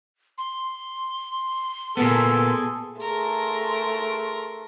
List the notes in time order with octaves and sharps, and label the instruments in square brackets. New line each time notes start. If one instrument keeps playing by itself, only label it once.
[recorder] C6
[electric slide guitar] A#2 A#3 B3 [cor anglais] G#4 [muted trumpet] A4
[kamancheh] A3 C6 [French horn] G#4 [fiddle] A#4